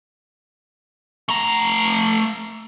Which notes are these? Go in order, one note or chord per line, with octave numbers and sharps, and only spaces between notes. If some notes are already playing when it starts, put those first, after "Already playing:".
A3 A#5